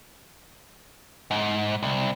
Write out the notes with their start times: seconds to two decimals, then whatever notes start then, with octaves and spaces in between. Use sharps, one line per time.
1.31 G#2
1.83 C2